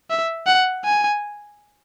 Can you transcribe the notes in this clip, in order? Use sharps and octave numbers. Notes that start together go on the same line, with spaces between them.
E5
F#5
G#5